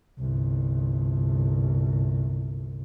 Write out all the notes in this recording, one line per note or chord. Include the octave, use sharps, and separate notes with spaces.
G1 C2